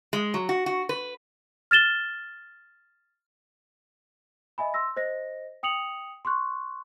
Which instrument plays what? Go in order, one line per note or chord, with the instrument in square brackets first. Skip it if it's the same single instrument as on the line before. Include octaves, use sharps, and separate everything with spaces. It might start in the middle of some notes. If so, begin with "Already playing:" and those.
[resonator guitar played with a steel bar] G#3
F#3
F#4
F#4
B4
[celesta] F6 A6 E7 G7
D#5 E5 G#5 B5
C6 E6 A#6
C5 D#5 A#6
G5 D#6 C#7 F7 F#7
C6 C#6 F#6